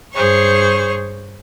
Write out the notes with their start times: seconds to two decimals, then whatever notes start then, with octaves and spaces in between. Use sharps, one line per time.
0.13 G2 G#4 C5 C#5 C#6